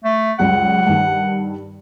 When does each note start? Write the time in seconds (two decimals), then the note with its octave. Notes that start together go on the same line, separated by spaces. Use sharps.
0.04 A3
0.39 C#2 F#2 G3 F#5
0.87 G2 D#3